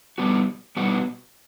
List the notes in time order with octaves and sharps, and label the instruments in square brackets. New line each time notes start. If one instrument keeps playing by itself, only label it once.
[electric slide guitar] B2 G3 B3 F#4
B2 G3 B3 F#4